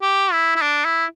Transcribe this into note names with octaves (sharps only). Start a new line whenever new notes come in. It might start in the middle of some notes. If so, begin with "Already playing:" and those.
G4
E4
E4
D4
E4